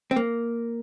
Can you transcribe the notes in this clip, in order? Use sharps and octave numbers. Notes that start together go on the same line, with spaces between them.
C4
A#3